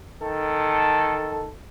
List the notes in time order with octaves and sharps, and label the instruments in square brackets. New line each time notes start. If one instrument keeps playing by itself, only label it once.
[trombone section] D#3 A4